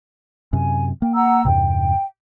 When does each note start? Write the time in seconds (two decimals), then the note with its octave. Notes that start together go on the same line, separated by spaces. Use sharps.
0.53 F#2 C3 G#5
1.02 A#3 G5
1.15 F#5 A#5 E6
1.45 E2 G2 C3 G5